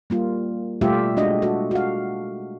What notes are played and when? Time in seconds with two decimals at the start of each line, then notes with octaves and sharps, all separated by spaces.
0.10 G3 A#3 F4
0.81 B2 G3 A3 F4 G4 E5
1.17 G#3 D4 F#4 D#5
1.42 F#4 A4
1.71 F#4 F5